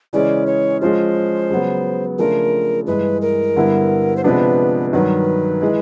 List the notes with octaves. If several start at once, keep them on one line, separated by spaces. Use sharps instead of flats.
C#3 E3 G#3 C#4 D5
C#5
F3 G#3 C#4 F4 C5
C#3 F#3 B3
C#3 F3 A3 D4 F4 A#4
G2 E3 G#3 B4
A#4
G2 D3 G3 B3 E4
C5
C3 F3 G#3 B3 D4 B4
G2 D#3 F#3 B4
E3 G#3